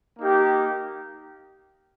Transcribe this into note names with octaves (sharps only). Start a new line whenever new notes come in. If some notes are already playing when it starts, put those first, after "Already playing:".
A#3 D#4 G4